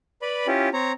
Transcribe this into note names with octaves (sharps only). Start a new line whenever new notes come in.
B4 D5 B5
C#4 E4 F4 G4
C4 C#5 A#5